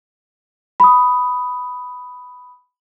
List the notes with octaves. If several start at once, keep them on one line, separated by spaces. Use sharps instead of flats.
B5 D#6